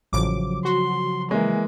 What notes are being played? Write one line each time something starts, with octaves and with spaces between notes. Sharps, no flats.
A1 C#3 F3 F#3 D6
F#4 C6
E3 G#3 A#3